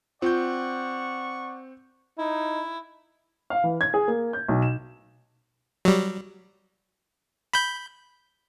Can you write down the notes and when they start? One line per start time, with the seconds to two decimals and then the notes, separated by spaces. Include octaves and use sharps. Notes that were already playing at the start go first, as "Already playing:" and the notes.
0.22 C4 F4 D5 F#5 C#6 G6
2.18 D#4 E4
3.50 F5
3.64 E3
3.81 G#6
3.94 G#4
4.08 A#3
4.33 G6
4.49 B1
4.62 E7
5.85 F#3 G3
7.53 B5 G6